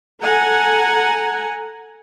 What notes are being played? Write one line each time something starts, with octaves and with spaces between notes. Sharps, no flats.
A4 F#5 G#5 A#5